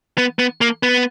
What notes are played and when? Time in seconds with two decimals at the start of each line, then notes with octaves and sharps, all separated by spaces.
0.18 B3
0.39 B3
0.61 A#3
0.83 B3